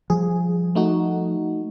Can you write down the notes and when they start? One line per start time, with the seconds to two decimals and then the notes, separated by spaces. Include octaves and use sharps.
0.10 F3 G3 G#4
0.75 A3 D#4 F#4